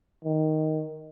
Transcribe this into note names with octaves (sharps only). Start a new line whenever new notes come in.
D#3